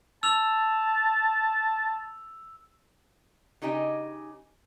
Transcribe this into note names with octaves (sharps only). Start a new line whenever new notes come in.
A5 E6 F7
C#3 D#4 G4 D#5 G#5